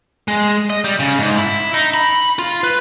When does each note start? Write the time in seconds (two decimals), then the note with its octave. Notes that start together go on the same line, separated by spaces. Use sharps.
0.28 G#3
0.70 D#5
0.84 G3
0.99 C#3
1.18 G#2
1.38 E4
1.74 D#4
1.94 B5
2.39 F4
2.64 B4